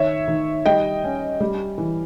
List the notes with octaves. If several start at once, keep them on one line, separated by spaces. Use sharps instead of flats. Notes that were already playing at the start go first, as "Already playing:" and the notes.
Already playing: D#3 C#5 E5
D#3
G3 D#5 G5
C#4
G3
E3